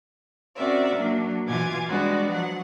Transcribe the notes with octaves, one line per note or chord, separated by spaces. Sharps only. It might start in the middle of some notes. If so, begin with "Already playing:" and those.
C4 C#4 F#4 A#4 D5 E5
F#3 A#3 D4
B2 E3 F4 G#5 D6 G#6
G3 G#3 B3 D4 F#4
F3 F#3 F#5